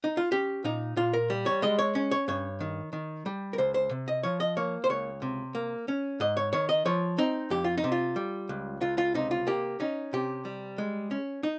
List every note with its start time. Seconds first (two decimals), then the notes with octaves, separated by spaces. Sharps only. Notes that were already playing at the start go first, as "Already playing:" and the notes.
0.04 D#4
0.17 F4
0.32 C#4 G4
0.64 A#2 D#4
0.96 A#2 F4
1.13 A#4
1.30 G3
1.46 C#5
1.62 G#3 D#5
1.79 C#5
1.95 C#4
2.11 C#5
2.28 G2 C#5
2.60 D#3
2.93 D#3
3.26 G3
3.53 A#4
3.58 C#2 C5
3.74 C5
3.91 C3
4.08 D#5
4.23 F3 C#5
4.40 D#5
4.57 A#3 C#5
4.84 C5
4.90 C#2 C#5
5.22 C3
5.55 A#3
5.88 C#4
6.20 G#2 D#5
6.37 C#5
6.53 D#3 C#5
6.69 D#5
6.85 F3 C#5
7.18 C4 D#4
7.50 F2 G4
7.64 F4
7.78 D#4
7.84 C3
7.92 F4
8.16 G3
8.49 C#2
8.81 C#2 F4
8.98 F4
9.14 C3 D#4
9.31 F4
9.47 A#3 G4
9.80 C#4 D#4
10.13 C3 G4
10.45 G3
10.78 G#3
11.11 C#4
11.43 D#4